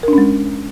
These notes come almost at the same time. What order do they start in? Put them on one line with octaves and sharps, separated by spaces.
A#4 D4 C#4 G#3